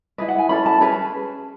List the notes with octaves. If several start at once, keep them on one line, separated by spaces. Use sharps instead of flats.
E4 G#4 B4 D#5
F#5
G#5
C#4 E4 A4 B5
A5
C#4 G#4 B4 B5